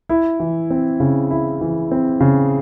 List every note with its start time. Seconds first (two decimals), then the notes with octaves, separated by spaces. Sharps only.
0.09 E4
0.40 E3
0.70 C4
1.00 C#3
1.30 E4
1.61 E3
1.91 C4
2.20 C#3